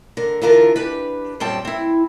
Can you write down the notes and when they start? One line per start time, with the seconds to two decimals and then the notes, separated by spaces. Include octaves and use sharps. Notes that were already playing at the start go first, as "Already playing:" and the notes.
0.17 D3 A#4
0.42 D3 E3 F4 A#4 D5 A5
0.76 D4 G4 B4
1.40 F#2 A#2 G3 C4 G5 A5
1.65 C4 E4